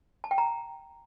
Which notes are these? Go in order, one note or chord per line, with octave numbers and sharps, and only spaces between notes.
A5
G5
A#5